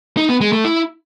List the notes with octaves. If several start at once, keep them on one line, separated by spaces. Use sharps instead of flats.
D#4
B3
G#3
A3
E4